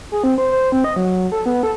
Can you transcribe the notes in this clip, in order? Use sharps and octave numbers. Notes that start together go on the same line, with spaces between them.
G#4
C4
C5
C5
C4
D#5
F#3
A4
B3
A4